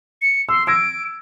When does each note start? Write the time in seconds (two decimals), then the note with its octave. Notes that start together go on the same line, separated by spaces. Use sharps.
0.22 C#7
0.49 C6 E6
0.67 E6 G#6 A#6 D7